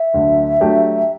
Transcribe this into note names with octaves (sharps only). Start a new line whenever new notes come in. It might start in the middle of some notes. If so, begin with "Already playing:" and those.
Already playing: E5
D2 D3 F#3
F#3 A3 D4 G4